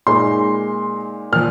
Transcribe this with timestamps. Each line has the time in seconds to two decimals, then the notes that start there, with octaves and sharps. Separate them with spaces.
0.07 A#2 G#3 D#4 C6
1.32 A#2 F3 F6